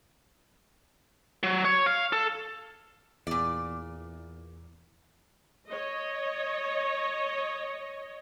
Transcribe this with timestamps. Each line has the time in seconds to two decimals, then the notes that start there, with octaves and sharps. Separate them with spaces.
1.43 F#3
1.65 C#5
1.86 F5
2.13 A4
3.27 E2 A#2 D5
5.67 C#5 D#5